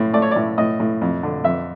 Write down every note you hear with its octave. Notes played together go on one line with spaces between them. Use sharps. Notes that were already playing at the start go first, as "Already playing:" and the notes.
Already playing: A2
A3 D5
C#5
D5
A2
A2 D#5
A2
F2
D3
F2 E5